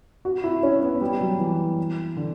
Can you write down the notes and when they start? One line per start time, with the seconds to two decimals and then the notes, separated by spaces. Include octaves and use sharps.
0.25 F#4
0.44 E4
0.63 C#4
0.82 B3
1.01 G3
1.21 F#3
1.39 E3
2.17 D3